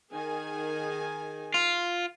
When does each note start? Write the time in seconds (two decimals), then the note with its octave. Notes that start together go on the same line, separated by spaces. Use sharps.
0.12 D#3 G#4 G#5
1.54 F4